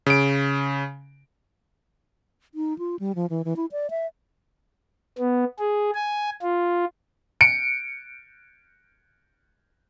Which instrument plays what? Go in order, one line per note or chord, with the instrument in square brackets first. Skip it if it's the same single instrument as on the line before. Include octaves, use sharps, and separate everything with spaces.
[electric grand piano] C#3 D7
[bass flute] D#4
F4
G3
F3
E3
E3
E4
D5
E5
[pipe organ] B3
G#4
G#5
F4
[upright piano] C#7 D7